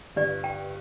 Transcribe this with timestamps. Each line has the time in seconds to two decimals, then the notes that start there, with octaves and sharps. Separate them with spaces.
0.16 G1 G2 D5
0.44 G5